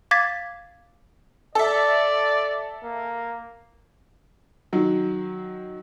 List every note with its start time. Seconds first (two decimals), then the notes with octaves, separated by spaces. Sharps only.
0.11 F5 D6 G#6 A6 B6
1.55 A4 D5 E5
2.84 A#3
4.73 D#3 F#3